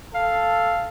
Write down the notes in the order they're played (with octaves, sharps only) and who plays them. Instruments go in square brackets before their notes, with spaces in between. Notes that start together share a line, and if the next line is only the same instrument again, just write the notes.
[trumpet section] A4 [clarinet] F5